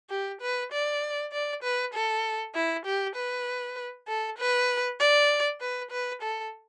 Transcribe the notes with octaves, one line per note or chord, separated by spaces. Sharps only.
G4
B4
D5
D5
B4
A4
E4
G4
B4
A4
B4
D5
B4
B4
A4